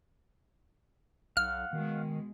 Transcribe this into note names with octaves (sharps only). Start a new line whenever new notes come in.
B1 F5 F#5 F6
B2 D#3 G#3